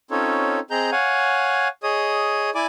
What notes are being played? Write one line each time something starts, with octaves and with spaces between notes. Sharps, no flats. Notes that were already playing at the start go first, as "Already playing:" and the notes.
C4 C#4 D#4 F4 A4 C#5
C4 G#4 D#5 A#5 G6
C#5 F5 F#5 G#5
G#4 C#5 D#5 D#6
E4 D5 G#5 D6